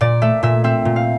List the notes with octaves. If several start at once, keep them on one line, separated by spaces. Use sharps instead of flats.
A#2 D5
A3 E5
A#2 E5
C4 E5
A#2
F5